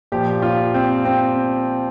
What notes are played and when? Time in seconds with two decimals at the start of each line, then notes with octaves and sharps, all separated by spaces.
0.12 A#2 F3 G4
0.42 F4
0.74 C4
1.05 C4